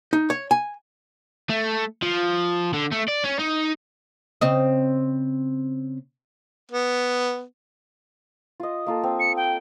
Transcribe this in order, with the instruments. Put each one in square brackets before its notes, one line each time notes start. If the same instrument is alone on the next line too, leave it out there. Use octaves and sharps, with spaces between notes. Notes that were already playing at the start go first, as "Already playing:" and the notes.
[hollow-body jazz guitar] D#4
C#5
G#5
[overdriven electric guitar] A3
F3
D3
A3
D5
C#4
D#4
[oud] C#3 C4 D#5
[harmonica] B3
[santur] F4 D#5
A#3 F4 A4
C4
[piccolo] C#7
G5